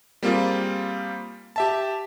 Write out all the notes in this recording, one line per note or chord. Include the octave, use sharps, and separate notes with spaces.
G3 A#3 C4 F4 G#4
G4 E5 A5